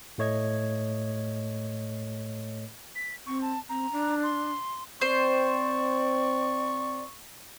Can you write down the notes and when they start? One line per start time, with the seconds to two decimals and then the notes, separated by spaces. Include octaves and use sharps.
0.18 A2 A3 C#5 D#5 G#6
2.95 B6
3.26 C4 C#6
3.42 A5
3.69 C4 A#5
3.92 D4
4.23 C6
5.01 C4 C5 D5 C#6